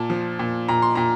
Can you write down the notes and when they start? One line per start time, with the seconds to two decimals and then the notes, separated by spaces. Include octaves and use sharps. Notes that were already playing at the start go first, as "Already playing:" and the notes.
Already playing: A#2 A5
0.10 F3
0.39 A#2
0.69 A#2 A#5
0.82 C6
0.95 A#2 A#5